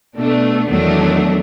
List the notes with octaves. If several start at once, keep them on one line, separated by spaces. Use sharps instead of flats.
B2 A3 D4
E2 D#3 F#3 A3 D4